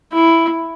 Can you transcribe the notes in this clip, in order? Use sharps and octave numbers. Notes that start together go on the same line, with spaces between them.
E4